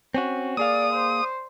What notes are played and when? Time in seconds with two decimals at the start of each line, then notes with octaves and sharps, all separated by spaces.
0.15 C4 C#4 F#4
0.57 A#3 G#4 D5 F5 D#6
0.93 C5